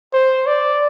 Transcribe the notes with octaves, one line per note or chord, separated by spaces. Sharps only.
C5
D5